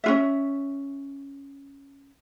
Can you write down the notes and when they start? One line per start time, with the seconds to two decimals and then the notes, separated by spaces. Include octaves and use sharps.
0.04 C#4 F4 E5